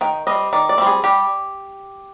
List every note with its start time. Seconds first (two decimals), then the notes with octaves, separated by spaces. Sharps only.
0.01 D#3 G5
0.27 G3 C4 D#5
0.53 D#3 D5
0.69 D5
0.78 G3 C4
0.87 G#4
1.04 G3 G4